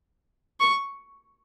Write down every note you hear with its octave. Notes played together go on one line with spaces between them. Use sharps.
C#6